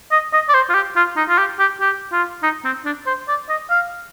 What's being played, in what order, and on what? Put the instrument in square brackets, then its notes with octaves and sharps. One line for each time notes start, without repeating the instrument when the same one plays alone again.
[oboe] D#5
D#5
D5
C5
F4
G4
F4
D#4
F4
G4
G4
G4
F4
D#4
C4
D4
C5
D5
D#5
F5